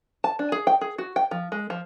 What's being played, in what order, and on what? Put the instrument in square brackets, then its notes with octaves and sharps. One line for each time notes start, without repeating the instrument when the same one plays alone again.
[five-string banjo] A5
D4
G#4
G5
G#4
F#4
G5
F3
G#3
F3